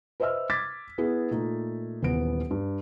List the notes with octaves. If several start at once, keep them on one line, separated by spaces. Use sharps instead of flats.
B4 C5 D#5 E5 E6 F6
D6 G#6 A6 B6
B3 E4 G#4
A#2 A3 D#4
D#1 E3 B3 D7
G2